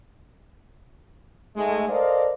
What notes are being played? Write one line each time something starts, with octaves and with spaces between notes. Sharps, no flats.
G#2 G#3 A3
A4 A#4 C5 D5 D#5 F5